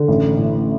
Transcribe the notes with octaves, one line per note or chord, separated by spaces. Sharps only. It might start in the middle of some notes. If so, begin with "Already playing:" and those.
Already playing: D3
A1
A2